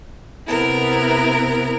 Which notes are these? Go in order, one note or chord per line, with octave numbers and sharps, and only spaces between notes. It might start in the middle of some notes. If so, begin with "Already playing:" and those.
C3 B3 E4 A#4